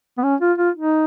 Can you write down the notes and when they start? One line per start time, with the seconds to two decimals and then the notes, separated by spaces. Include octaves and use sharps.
0.18 B3
0.23 C#4
0.41 F4
0.58 F4
0.75 D#4